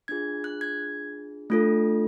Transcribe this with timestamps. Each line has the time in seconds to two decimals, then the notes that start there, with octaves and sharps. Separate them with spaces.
0.08 D4 F4 G#4 G#6
0.44 F#6
0.61 G#6
1.50 A3 D4 F4 A4